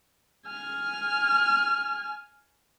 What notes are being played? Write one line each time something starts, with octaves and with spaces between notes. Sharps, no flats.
G#5 F6